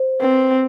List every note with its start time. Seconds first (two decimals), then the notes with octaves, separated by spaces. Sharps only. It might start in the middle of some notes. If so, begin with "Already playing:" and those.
Already playing: C5
0.21 C4 B4